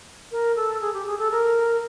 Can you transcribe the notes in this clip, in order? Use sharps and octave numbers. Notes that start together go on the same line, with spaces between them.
A#4
A4
G#4
G4
G#4
A4
A#4